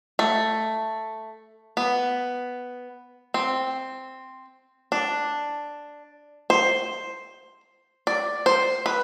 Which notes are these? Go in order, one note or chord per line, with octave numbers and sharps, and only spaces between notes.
A3
B3
C4
D4
C5
D5
C5
B4